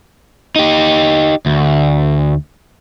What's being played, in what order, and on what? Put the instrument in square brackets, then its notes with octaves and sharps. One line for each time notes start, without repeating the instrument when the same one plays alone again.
[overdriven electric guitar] D#4 G4
D2